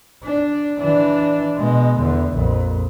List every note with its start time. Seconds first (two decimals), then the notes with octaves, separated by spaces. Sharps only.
0.23 D4
0.79 E3 D4
1.56 B2 G#3
1.98 E2 D3
2.34 A#1 F2